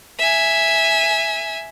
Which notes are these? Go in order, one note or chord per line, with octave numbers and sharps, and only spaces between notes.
E5 G#5